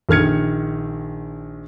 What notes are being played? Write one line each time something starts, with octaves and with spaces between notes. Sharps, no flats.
A#1 D#3 F6 G#6 C#7